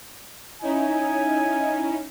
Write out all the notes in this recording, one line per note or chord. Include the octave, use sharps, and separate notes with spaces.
C#4 D#4 E4 G#5